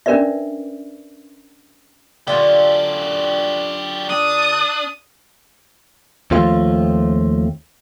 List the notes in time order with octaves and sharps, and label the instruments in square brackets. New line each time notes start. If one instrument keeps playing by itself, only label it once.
[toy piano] C#4 D4 A#4 B4 D5 E5
[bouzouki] D3 F4 [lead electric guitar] F#3 G4
[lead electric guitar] D4 [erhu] D#6
[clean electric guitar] D#2 F3 A3 C4 F4